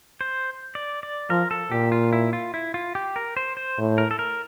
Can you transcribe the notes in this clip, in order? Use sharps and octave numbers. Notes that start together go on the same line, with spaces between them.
C5
D5
D5
F3 A#4
A4
A#2 G4
F4
E4
F4
E4
F4
G4
A#4
C5
C5
A2
A#4
A4
A#4